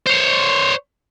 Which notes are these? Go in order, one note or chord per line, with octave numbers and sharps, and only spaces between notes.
C5 C#5